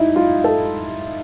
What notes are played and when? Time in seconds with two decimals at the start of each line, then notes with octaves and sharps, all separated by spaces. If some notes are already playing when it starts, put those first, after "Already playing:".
Already playing: D#4 E4
0.16 F4
0.44 A4